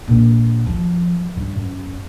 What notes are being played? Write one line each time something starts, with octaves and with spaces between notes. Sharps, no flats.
A#1
F3
G2
F#2